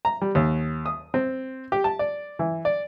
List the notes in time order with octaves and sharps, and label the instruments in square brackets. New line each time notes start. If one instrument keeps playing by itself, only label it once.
[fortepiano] A#5
G3
D#2
D#6
C4
G4
A5
D5
E3
D5